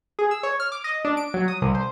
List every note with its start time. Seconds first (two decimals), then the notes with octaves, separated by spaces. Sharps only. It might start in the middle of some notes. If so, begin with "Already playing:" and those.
0.19 G#4
0.31 E6
0.43 C#5
0.60 F6
0.72 D6
0.84 D#5
1.05 D4
1.17 D7
1.34 F#3
1.48 D#6
1.62 C2
1.75 C5